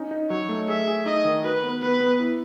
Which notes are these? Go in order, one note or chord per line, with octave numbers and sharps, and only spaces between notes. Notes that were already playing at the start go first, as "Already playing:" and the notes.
Already playing: C#4 D#4
D#4
F#3 C#5
A3
G#4 E5
G#4
D#4 D#5
D#3
F#4 B4
B3
B3 B4
B3
E4